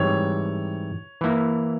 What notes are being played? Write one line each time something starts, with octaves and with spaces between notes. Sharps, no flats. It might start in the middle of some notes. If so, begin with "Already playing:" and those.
Already playing: G#2 E3 G3 C4 G4 C#5
E3 A#3 E4